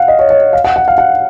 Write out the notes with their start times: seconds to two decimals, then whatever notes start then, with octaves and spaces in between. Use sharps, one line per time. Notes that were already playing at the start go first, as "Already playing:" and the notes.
Already playing: F5 F#5
0.08 D#5
0.19 C#5
0.30 C#5
0.53 F5
0.64 F#5
0.76 F#5
0.88 F5
0.98 F#5